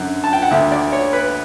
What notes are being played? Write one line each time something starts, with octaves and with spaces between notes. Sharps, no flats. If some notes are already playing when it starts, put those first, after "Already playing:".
Already playing: F#2 D3
A5
G5
F#5
D2 D3 E5
D5
C#5
B4